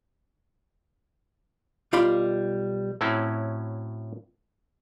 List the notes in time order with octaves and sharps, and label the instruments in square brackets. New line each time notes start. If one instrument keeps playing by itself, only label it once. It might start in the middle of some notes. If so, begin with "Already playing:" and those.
[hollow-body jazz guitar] B1 G3 F4 D5 B5
[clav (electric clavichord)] A2 F#3 C4 C#4 E4